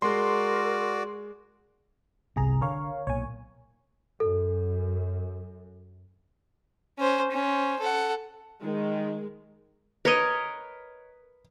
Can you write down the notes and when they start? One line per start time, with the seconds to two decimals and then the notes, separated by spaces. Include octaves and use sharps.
0.02 G#3 F#4 A#4 D5 C6
2.36 G1 C2 C3 G#4 A#5
2.61 D3 A#4 C#5 F5
3.07 B1 A#2 C#5 G#5
4.20 F#2 A4
6.98 C#4 C5
7.31 C#4 C5
7.80 A4 F#5
8.62 D#3 G#3
10.05 A#4 B4 C#5 D#5